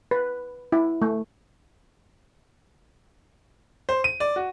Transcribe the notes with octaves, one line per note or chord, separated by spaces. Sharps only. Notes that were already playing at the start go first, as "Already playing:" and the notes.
B4
E4
A3
C5
D#7
D5
F#4